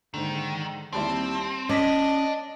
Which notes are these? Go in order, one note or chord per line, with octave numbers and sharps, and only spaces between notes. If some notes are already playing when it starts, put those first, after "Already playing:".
G#2 D3 D#3
D#2 G3 C4 E4 A5
C#4 D5 D#5 A5 D6 A#6 B6